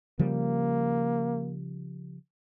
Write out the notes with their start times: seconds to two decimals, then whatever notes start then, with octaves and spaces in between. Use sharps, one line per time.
0.19 C#3 F3 G3 A#3